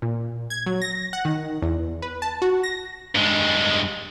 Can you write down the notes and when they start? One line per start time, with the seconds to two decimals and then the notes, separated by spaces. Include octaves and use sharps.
0.02 A#2
0.50 G#6
0.66 F#3
0.82 A#6
1.13 F#5
1.25 D#3
1.62 E2
2.02 B4
2.22 A5
2.42 F#4
2.63 A#6
3.15 G2 G#3